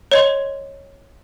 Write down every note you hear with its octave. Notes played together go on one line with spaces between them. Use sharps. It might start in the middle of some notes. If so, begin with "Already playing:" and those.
C#5 D#5 C6